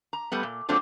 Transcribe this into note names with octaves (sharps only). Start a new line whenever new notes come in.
A#5
G3 A3 B3
A#2
F#3 A3 A#3 C4 D4 F4